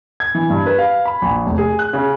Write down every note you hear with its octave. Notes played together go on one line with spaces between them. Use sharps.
G#6
E3
G2
B4
F5
B5
A#1
F1
G#4
F#6
C#3